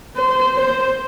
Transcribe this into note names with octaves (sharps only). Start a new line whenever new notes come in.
C5
C5